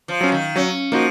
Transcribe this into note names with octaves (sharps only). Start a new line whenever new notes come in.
F3
F#3 C#4
D#3
F#3 C#4
F3 A#3 D#4 F#4